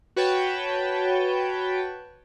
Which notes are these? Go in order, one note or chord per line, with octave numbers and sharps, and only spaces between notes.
F#4 B4 C#5 G5 A5